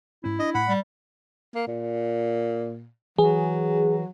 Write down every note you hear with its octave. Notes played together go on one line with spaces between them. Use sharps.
G#2 C#4 E4
D4 D#5
A2 F#5 B5
G3
A#3
A#2
E3 F#3 G#4